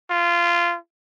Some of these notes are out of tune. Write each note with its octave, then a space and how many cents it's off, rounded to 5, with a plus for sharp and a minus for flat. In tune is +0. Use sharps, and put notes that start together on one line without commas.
F4 -20